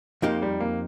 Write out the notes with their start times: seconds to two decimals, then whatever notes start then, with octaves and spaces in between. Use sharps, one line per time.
0.22 F2 F3 A#3 D#4 G4
0.42 G3
0.60 A#3